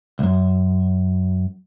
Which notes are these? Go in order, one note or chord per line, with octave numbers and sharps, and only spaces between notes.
C2 F#2